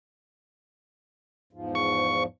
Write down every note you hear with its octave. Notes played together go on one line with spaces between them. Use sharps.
E2 G#2 F3
C#6